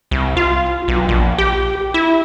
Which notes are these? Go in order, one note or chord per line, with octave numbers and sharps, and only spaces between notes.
C2
F4
B1
A#1
G4
E4